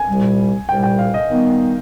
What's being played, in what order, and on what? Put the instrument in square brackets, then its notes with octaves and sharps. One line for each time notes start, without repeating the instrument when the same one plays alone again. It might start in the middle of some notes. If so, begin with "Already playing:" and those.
Already playing: [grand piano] G#5
[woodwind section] C2 A#2 G3
[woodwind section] C2 A#2 G3 [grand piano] G5
[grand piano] G5
F5
D#5
[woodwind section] D#3 G3 B3